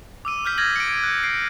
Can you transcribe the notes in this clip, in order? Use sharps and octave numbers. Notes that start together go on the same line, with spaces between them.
D6 E6 D#7
E6 F6 G6 B6
G6 G#6 A#6 D#7 F#7
C#7 D7
F#6
C7 D7